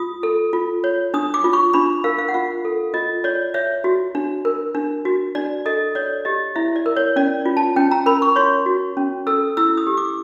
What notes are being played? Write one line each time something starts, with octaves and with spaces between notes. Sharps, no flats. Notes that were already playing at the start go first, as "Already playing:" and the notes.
Already playing: F4 D#6
A4
F4
C#5
D4 D#6
D6
F4
C#6
D4 B5
A#4 F5
F5
F#5
F4 F5
A4
F4 D#5
C#5 D5
C#5 E5
F#4
D4
A#4
D4
F#4
D4 D5
A4 D#5
C#5 D5
G4 D#5
E4 E5
D5
A#4
C#5
C#4 D5
F4
A5
C#4 G5
A#5
A#4 B5
C#6
C#5 C6
F#4
C#4
A4 E6
E4 E6
D#6
G4
D6